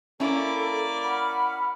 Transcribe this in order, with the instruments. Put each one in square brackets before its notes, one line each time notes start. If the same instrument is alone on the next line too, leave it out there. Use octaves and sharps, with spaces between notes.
[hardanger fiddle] A#3 D5 [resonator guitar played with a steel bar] C#4 E4 [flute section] A4
[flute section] F#5 F6 [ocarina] B5